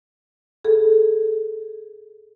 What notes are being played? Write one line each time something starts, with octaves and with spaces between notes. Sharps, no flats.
G#4 A4